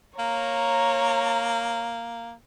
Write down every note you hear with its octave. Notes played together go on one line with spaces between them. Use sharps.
A#3 C#5 A#5